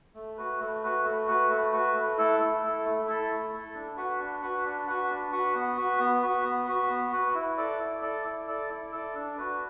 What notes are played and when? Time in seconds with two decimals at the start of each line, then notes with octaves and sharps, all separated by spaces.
0.15 A3
0.37 F#4 B4
0.60 A3
0.83 F#4 B4
1.04 A3
1.27 F#4 B4
1.50 A3
1.72 F#4 B4
1.95 A3
2.17 E4 A4
2.40 A3
2.63 E4 A4
2.85 A3
3.07 E4 A4
3.30 A3
3.52 E4 A4
3.74 D4
3.97 F#4 B4 F#5
4.19 D4
4.42 F#4 B4 F#5
4.65 D4
4.87 F#4 B4 F#5
5.10 D4
5.32 F#4 B4 F#5
5.55 B3
5.77 F#4 B4
5.99 B3
6.22 F#4 B4
6.44 B3
6.67 F#4 B4
6.89 B3
7.12 F#4 B4
7.35 E4
7.57 A4 D5
7.79 E4
8.02 A4 D5
8.24 E4
8.47 A4 D5
8.70 E4
8.92 A4 D5
9.15 D4
9.37 F#4 B4